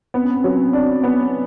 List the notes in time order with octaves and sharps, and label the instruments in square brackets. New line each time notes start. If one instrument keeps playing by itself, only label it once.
[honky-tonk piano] B3 [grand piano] C4
[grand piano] C#4
C4
[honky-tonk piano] F#3 [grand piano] C#4
[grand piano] C4
[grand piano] C#4 [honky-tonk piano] D4
[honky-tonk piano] B3